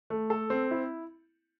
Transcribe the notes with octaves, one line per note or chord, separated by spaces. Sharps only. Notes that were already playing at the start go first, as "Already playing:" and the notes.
A3
A4
C4
E4